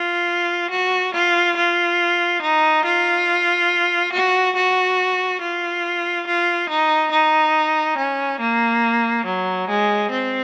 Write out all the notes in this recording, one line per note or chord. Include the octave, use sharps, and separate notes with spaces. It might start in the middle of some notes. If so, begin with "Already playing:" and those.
Already playing: F4
F#4
F4
F4
D#4
F4
F#4
F#4
F4
F4
D#4
D#4
C#4
A#3
F#3
G#3
C4